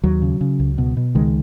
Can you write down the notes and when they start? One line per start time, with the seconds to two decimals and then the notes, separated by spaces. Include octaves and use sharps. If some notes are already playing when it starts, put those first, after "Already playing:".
0.04 D#2 F#3
0.22 C#3
0.41 C#3
0.59 C#2
0.78 B2
0.97 B2
1.15 C#2 D#3 G#3